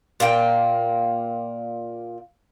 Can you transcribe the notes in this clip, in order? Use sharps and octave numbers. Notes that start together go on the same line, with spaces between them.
A#2 A#3 D#4 G5